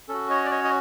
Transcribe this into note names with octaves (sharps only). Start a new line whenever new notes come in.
C#4 F#4 A4
C#5 D#5
D5
C#5 D#5
D#5